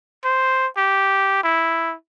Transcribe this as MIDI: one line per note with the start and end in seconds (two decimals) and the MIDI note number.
0.24 0.67 72
0.77 1.43 67
1.44 1.94 64